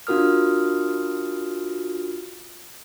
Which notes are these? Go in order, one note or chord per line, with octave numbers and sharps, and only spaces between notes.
D4 F4 F#4 A#4 D#6 F6